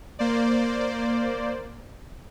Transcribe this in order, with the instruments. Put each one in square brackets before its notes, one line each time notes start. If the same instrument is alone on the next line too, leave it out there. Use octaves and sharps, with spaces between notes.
[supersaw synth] A#3 C5 D5